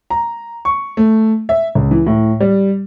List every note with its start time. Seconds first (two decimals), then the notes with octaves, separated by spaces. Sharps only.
0.10 A#5
0.65 C#6
0.97 A3
1.49 E5
1.75 C#2
1.91 E3
2.07 A2
2.40 G3